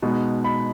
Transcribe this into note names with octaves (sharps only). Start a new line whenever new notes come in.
B2 G#3 B3 D#4
B5